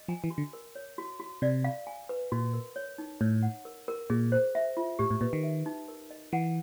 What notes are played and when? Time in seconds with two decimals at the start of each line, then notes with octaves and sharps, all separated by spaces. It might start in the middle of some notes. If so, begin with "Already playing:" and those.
Already playing: D#5
0.08 F3 G#5
0.24 E3
0.30 F#4
0.38 D3
0.53 A#4
0.75 C#5
0.98 F#4
1.20 F#4
1.42 C3 D5
1.64 F5
1.87 G#5
2.09 B4
2.32 A#2 F#4
2.54 A#4
2.76 C#5
2.98 D#4
3.21 A2 C#5
3.43 F#5
3.65 A#4
3.88 A#4
4.10 A#2 G#4
4.32 C5
4.55 E5
4.77 F4
4.99 A2 G4
5.11 A2
5.21 A#2 B4
5.33 D#3
5.43 E5
5.66 D#4
5.88 A#4
6.11 D#5
6.33 E3 F#5